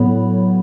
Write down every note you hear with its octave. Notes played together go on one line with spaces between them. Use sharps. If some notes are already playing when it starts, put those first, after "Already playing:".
Already playing: A2 F#3 B3